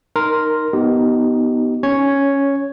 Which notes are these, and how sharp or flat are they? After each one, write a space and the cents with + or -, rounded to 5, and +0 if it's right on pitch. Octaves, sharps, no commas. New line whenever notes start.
D#4 +0 A#4 +0 C6 +0
B3 +0 D#4 +0 G4 -35
C#4 +0 C#5 +0